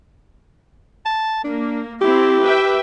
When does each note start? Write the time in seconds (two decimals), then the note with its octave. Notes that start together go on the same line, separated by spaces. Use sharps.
1.06 A5
1.44 A#3 D4
2.01 C4 E4 G4
2.44 B4 E5 G5